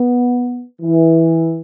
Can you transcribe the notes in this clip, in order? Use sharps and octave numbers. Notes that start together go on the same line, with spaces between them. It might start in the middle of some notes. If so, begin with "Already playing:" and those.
Already playing: B3
E3